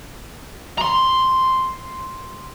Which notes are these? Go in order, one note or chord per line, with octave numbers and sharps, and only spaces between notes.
A#5 C6